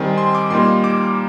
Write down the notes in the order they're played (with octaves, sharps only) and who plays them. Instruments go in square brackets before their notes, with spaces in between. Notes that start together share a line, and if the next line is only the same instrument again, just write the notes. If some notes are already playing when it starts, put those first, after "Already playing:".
Already playing: [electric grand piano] D#3 G3 C4 G#5
C6
D6
A#2 G3 A#3 D#4 C6
D6